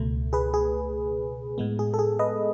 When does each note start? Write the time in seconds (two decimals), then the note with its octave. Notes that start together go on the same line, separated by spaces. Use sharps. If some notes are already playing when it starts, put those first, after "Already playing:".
Already playing: C#2 B2 A3
0.33 G#4 B4
0.54 G#4
1.58 A2 G#3 B3
1.79 G#4
1.94 A4
1.99 G#4
2.19 B4 D#5